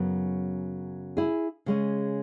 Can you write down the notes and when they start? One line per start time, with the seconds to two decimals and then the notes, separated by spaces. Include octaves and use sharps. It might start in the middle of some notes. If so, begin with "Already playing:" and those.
Already playing: F#2 C#3 F#3 B3
1.17 E4 G#4
1.66 C#3 G#3 C#4